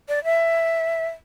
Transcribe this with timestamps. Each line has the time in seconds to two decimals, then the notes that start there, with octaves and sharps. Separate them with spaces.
0.09 D5
0.24 E5